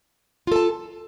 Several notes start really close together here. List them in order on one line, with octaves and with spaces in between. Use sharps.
F4 A4 A5